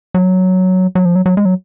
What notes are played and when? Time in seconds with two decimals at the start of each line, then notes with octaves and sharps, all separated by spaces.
0.14 F#3
0.95 F#3
1.05 F3
1.16 F#3
1.26 F#3
1.37 G#3
1.45 F#3